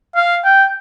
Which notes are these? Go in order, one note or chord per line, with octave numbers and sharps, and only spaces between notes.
F5
G5